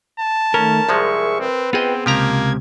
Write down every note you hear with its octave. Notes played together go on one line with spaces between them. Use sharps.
A5
D#3 A3 C#4 A#4
C2 F3 G#3 G#4 E5 C#6
C4 B4
B3 C4 F4 G#4 D#5 G5
C#2 C3 F3 A#3 G4 A#5 G#6